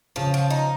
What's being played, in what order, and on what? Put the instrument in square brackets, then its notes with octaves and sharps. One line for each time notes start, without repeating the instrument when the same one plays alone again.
[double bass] C#3 [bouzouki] F3
[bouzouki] F3
D#4